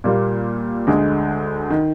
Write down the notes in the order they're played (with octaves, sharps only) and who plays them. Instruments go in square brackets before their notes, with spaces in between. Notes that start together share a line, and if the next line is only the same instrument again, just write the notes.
[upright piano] A#2 G3 A#3 F4
D2 D3 G#3
D#3